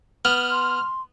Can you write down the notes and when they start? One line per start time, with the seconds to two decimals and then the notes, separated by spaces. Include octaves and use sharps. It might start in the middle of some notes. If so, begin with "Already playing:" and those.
0.25 B3 F6
0.52 C6